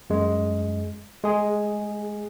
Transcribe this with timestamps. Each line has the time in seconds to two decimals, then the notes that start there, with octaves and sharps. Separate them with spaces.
0.10 F#2 G#3
1.24 G#3 G#4